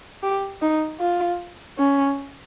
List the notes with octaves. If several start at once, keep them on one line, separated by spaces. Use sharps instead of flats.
G4
D#4
F4
C#4